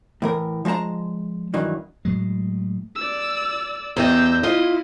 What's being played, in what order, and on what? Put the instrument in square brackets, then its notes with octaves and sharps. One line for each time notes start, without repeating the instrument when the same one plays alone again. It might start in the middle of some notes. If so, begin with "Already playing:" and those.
[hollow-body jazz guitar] A2 E3 A#4
F3 G#3 D#5 A5 A#5
G2 D#3 E3 F#3
[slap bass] A2 F#3 G#3
[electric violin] D5 E6
[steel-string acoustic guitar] E2 G4 D#5 [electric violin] E6 G6
[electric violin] E4 [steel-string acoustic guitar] F4 D#5